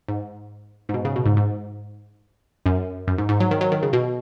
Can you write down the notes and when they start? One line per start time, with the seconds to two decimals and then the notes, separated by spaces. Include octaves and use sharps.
0.08 G#2
0.89 G#2
0.94 B2
1.05 C#3
1.16 B2
1.26 G#2
1.37 G#2
2.66 F#2
3.08 F#2
3.18 G#2
3.29 G#2
3.40 F#3
3.51 D#3
3.61 F#3
3.72 D#3
3.83 C#3
3.93 B2